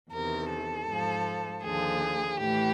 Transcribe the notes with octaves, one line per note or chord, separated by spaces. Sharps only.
E2 C3 D#3 A#4
A4
G#2 F3
D#2 D3 F3 G#4
A2 E3 G4